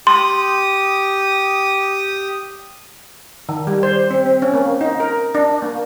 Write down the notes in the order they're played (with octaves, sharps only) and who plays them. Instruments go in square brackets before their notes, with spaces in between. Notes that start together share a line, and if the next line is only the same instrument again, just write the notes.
[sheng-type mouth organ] G4 D#6 [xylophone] C6
[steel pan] D#3
G3
C5
C4
C4
C#4
A#3
D#4
A#4
D4
A#3